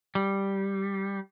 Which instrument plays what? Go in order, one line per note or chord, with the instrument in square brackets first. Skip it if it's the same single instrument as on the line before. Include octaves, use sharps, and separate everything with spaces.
[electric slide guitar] G3